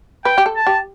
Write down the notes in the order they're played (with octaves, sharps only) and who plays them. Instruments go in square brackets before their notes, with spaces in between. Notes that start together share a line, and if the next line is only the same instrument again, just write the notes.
[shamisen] B4 [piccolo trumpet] G5
[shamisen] G4
A4
[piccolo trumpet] A5
[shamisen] G4